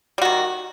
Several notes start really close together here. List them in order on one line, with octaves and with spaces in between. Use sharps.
G3 F#4 D#3